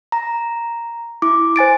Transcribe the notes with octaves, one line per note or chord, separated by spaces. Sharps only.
A#5
E4 D6
C5 G#5 A6 D7